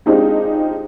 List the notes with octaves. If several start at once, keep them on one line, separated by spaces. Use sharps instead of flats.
G#3 C4 D4 D#4 F4 G4